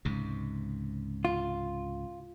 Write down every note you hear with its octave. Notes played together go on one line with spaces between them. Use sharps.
C#2 G#2 C3
F4